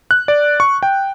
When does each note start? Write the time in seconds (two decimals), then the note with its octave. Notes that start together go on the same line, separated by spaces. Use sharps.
0.11 F#6
0.28 D5
0.60 C#6
0.83 G5